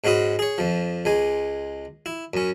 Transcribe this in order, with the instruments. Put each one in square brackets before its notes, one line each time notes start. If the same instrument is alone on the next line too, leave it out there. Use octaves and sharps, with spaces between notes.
[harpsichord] G#2 G#3 C#4 F#4 B5 D#6
G#4 C#5
F2 F3
C#2 G#3 G#5
E4
F#2 C#4